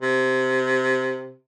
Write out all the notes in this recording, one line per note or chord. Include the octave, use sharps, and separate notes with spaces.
C3